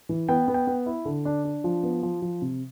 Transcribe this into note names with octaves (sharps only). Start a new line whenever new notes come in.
E3
B3 G5
B3
G5
B3
E4
D3
D4
D4
F3
B3
F3
F3
C3